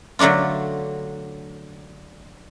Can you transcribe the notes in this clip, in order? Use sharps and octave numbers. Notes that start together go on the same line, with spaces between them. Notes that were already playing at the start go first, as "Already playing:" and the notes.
D3 F#3 A3 D4 F4